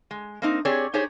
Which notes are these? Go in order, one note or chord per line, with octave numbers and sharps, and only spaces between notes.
G#3
A#3 C4 D#4
C4 G4 G#4 C#5 D5
D#4 G4 G#4 C5 C#5